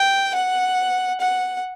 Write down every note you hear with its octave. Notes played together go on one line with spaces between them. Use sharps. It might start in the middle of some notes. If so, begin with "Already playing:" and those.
Already playing: G5
F#5
F#5